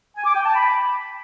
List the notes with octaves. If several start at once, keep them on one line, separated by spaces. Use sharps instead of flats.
G#5
D6
G5
A5
B5